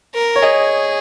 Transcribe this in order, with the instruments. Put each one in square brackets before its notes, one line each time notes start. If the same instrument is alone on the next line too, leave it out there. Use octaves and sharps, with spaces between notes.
[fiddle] A#4
[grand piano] C#5
[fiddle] G#4 [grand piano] D#5